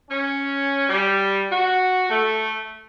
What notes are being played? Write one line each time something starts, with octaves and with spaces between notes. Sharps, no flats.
C#4
G3
F#4
A3